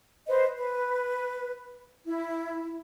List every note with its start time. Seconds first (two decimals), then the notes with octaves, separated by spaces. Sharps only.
0.27 B4 C5 D#5
0.57 B4
2.06 E4